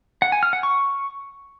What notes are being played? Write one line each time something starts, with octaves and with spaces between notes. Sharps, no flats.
F#5
G#5
F6
F#5
C#6